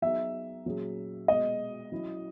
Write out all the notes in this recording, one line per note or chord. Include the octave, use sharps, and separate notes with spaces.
F#3 B3 D#4 G#4 E5
A#2 F#3 C#4 G#4
B2 G#3 B3 D#5
F#3 C#4 E4